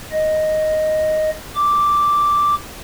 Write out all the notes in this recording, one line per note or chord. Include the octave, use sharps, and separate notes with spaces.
D#5
D6